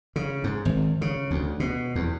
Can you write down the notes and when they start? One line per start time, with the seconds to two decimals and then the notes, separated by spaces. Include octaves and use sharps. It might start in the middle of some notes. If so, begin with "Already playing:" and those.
0.16 C#3
0.44 G#2
0.65 G#1
1.01 C#3
1.31 D2
1.60 B2
1.95 E2